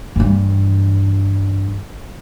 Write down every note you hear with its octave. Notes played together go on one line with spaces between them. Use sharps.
G2 E3